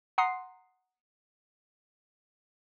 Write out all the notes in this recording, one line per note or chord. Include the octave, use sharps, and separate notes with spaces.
F#5 A#5 C6 D#6 C7